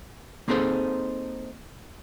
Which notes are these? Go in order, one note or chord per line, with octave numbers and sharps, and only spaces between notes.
A#3 C4 D#4 G#4 A4 C5